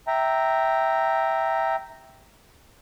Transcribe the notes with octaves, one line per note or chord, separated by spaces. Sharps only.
E5 G5 A#5